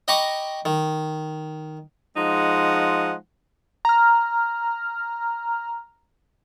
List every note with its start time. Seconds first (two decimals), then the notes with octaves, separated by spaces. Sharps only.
0.08 D#5 G5 A#5 B5 C#6 D6
0.65 D#3
2.16 F3 G#3 D#4 F#5
3.85 A#5 F6